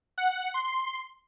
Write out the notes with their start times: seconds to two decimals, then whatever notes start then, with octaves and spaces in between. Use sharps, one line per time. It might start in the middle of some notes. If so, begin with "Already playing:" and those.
0.18 F#5
0.54 C6